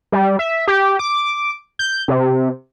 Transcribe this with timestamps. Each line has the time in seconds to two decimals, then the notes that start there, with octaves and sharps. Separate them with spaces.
0.12 G3
0.39 E5
0.68 G4
0.99 D6
1.79 G6
2.08 C3